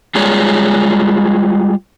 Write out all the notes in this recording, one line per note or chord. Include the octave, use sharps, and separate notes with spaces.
G3 G#3 F4 G#4 C#5 D5